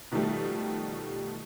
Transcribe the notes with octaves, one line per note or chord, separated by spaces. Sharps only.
B2 D#3 F3 G3 A3 G4